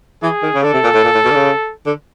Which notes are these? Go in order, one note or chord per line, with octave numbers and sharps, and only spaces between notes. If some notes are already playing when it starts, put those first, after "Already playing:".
E3 G#4
D#3
C#3
D3 A4
C3
A#2
A2
A#2
A2
B2
D3
C#3
D3